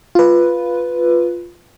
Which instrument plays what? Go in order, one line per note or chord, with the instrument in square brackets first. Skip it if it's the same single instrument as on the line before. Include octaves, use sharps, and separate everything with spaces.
[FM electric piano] F4 B4